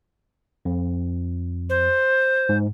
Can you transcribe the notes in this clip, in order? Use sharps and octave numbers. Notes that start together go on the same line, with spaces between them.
F2
C5
G#2